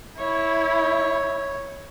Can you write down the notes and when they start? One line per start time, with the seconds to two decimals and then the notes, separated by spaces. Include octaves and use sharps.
0.19 E4 C#5